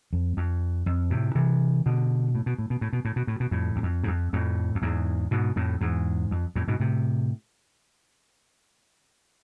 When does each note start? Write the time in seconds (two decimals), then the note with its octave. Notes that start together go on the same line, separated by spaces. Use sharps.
0.13 F2
0.37 F2
0.86 F2
1.11 A2 C3
1.35 C3 E3
1.86 B2 D3
2.35 A2
2.46 B2
2.58 A2
2.70 B2
2.81 A2
2.93 B2
3.05 A2
3.16 B2
3.27 A2
3.40 B2
3.51 F2 A2
3.76 E2
3.83 F2
4.04 G#2
4.07 F2
4.33 F2 A2
4.75 F2
4.82 E2 G#2
5.31 G#2 B2
5.56 F2 A2
5.81 E2 G#2
6.31 F2
6.56 F2 A2
6.68 G#2 B2
6.80 A2 C3